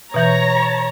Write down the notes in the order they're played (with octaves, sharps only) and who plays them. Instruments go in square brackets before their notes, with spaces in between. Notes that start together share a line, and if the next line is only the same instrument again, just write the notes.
[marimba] B2 E3 G6 [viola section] C#5 A#5